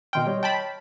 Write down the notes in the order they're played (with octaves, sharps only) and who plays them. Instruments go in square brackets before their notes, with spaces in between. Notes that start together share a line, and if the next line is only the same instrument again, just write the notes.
[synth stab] B2 D#3 G5 [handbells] D#5 C6 F6
[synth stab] G3 [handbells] C#5
[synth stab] G5 A5 B5